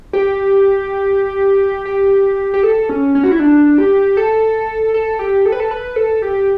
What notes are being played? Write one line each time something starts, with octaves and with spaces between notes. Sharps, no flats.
G4
G4
G4
A4
C#4
C#4
F#4
E4
D4
G4
A4
A4
G4
A4
B4
A4
B4
A4
G4